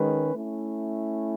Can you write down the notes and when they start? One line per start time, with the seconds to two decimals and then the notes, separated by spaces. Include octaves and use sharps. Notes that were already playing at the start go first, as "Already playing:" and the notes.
Already playing: D#3 G#3 C#4 G#4 B4
0.34 A3 C#4 E4